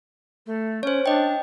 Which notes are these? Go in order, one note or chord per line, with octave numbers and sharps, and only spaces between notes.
A3
C#4 C5 C#5
D4 D#5 G5